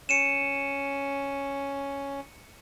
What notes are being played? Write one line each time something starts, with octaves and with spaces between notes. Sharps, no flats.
C#4 C#7 D#7 E7